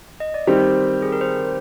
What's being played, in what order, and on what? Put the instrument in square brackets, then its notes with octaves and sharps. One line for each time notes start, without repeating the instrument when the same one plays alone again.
[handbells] D#5
D5
[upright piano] D#3 G3 C4 G4 [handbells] C5
[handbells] G#4
A#4
C5